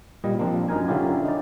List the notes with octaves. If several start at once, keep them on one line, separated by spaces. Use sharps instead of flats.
A#2 G3 D#5
F3 A#3 C4 D4
F#2 D#4 A#4 G#5
D3 C#4 E4 F4 G4
D#4 D5